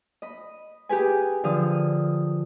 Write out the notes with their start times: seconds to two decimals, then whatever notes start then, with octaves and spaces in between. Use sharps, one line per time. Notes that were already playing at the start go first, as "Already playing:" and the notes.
0.22 D#5 B5
0.89 G4 G#4 B4 G#5
1.44 D3 F3 F5 D#6